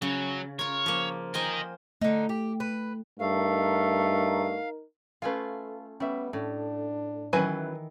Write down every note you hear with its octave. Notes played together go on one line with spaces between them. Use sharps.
C#3 F#3
F4 A#4 C#5
F3 A#3
A#4 C5 D#5 G5 G#5
D3 A3 D#4
G4
B4
G2 A3 D#4 A#4 F5
A3 C#4 F4 B4 F5
G3 B3 C#4 E5
A2 C#4 D4
D#3 E3 F#3 C#4 E4 B4 G#5